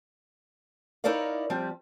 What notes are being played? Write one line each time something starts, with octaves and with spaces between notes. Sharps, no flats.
D#4 E4 A#4 C#5 D5 F5
F3 G3 C4